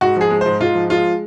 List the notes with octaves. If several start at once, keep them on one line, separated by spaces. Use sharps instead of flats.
G#2 F#4
F3 G#4
G#3
G#2 C5
G#2 F4
F3
G#3 F4